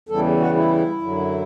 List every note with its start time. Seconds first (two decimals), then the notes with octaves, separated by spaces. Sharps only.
0.09 E2 C#3 E3 G3 A4
0.40 F#4
0.56 E4
1.02 F#2 D3 F#3